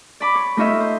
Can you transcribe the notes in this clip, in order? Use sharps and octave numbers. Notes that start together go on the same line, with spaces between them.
D5 B5 D6
C#5
A3 D#4 F4 C#5 D#5 E5
C5